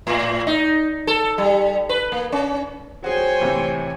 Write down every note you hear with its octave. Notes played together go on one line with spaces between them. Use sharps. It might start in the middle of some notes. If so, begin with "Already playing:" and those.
A2
D#4
A4
G3
B4
A#3
C#4
F#4 G#4 C5 C#5 G5 G#5
A2 C3 E3